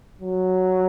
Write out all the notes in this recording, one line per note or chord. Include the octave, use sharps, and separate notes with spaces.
F#3